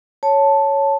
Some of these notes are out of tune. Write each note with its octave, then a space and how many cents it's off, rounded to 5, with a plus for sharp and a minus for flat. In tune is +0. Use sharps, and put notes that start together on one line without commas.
C#5 +0 A5 +0